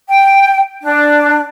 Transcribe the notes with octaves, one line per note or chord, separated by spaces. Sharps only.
G5
D4